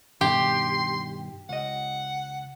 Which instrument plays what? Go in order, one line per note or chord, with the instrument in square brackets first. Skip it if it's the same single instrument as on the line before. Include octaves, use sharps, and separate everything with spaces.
[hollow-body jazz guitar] G2 B2 D#3 [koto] G4 [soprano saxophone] C6
[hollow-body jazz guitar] C#2 D#5 [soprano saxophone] F#5